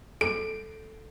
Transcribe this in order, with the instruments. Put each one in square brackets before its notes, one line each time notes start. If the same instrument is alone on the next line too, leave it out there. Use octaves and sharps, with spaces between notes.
[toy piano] A4 [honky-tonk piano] D7